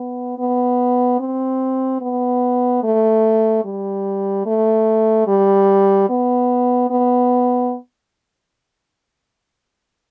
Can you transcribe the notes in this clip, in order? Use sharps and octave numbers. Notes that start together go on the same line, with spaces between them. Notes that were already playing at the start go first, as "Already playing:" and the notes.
Already playing: B3
B3
C4
B3
A3
G3
A3
G3
B3
B3